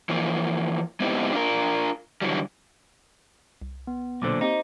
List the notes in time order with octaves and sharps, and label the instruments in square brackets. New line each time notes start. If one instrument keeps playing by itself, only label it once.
[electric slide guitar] E3 F3 A#3
G#3 B3 C4 D#4 E4 G4
D4 F4 A#4
D3 E3 F#3 G3
[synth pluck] C2
[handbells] B3
[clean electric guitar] B1 A#2 D3 [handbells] C5 D6
[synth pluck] A#3 C4 G4 [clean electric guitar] D#4